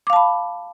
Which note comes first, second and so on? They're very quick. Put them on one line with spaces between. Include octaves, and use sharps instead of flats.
D6 F5 A5 B5